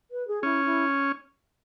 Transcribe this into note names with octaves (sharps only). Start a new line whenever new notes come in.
B4
G#4
C#4 E4
E4